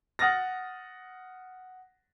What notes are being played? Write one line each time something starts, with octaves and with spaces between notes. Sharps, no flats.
F#5 D#6 F6 A6 A#6